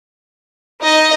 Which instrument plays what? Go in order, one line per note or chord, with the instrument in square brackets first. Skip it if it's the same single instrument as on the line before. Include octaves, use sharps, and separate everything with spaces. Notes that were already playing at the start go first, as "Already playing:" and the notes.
[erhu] D#4 [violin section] D#5